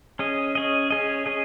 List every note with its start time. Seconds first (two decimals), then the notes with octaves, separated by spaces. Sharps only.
0.19 C#4 G#4 D#5
0.55 C#4 G#4 D#5
0.90 C#4 G#4 D#5
1.26 C#4 G#4 D#5